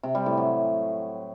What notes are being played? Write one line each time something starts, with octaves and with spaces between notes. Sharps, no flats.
C3
G3
A2
F#3